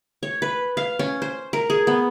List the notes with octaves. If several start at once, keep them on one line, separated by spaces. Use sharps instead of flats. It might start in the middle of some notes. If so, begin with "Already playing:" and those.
C#5
B4
F5
C#4
C5
A#4
G#4
B3